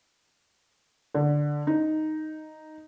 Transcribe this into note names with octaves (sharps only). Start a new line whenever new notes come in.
D3
D#4